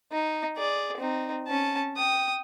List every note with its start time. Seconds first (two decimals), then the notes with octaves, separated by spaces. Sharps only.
0.12 D#4
0.57 G#4 D5
0.97 C4 D#4
1.48 C#4 A5
1.97 G5 D#6